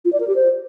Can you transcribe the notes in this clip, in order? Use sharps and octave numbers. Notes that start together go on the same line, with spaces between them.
F4
D5
A#4
G4
C5